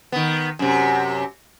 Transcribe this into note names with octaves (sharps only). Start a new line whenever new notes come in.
D#3 B3
F#2 C3